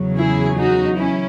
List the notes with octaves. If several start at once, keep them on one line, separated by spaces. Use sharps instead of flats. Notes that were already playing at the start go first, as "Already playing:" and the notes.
Already playing: E2 C#3 F#3
E4 G#4
D#4 F#4
C#4 E4